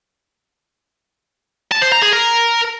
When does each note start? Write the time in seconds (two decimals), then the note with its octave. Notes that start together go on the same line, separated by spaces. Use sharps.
1.72 A5
1.82 C5
1.92 A#5
2.03 G#4
2.13 A#4